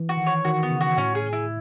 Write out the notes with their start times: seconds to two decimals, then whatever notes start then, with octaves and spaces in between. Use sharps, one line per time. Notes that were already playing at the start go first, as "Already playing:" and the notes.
Already playing: E3
0.09 F#4
0.17 D#3
0.26 C#5
0.45 D#3 F#4
0.63 B3
0.71 C#3
0.81 F#4
0.97 A2 C#4
1.15 G#4
1.33 E4